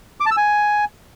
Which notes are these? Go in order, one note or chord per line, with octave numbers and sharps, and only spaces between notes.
D6
A5
E6
G#5